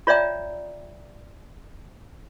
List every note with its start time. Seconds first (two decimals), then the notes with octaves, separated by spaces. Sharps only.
0.07 F4 C#5 D5 E5 G5 A#5